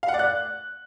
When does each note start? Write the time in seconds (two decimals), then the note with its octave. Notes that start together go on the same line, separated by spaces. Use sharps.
0.03 F5
0.08 F#5
0.14 D5
0.19 F#6